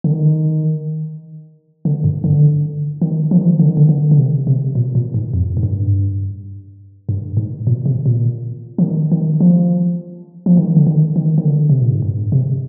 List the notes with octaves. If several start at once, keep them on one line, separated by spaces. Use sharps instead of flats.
D3
D#3
D3
G2
D3
D#3
F3
D#3
F3
D3
D#3
D3
D3
D3
C3
C3
A#2
A#2
G#2
F2
G#2
G2
G2
G#2
A#2
C3
A#2
F3
D#3
D#3
F3
F3
D#3
D3
D#3
D#3
D#3
D3
C3
A#2
G#2
G2
C3